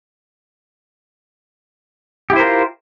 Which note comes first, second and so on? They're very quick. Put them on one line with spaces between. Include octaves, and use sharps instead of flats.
G4 E4 C5 A#4 F4